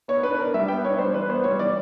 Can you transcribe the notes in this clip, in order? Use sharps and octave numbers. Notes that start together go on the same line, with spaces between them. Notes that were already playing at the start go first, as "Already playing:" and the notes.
B3 C#5
D4 B4
D4 A#4
G3 E5
B3 G5
D4 C#5
G3 C5
E3 B4
B3 C5
G3 C#5
E3 D5